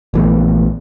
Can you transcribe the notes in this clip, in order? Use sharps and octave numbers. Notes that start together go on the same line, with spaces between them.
A#1 E3 A3 B3